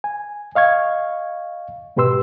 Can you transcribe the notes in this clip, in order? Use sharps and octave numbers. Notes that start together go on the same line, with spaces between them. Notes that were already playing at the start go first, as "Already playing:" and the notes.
G#5
D#5 F5 C#6 G#6
G#2 B2 G4 B4 C6 E6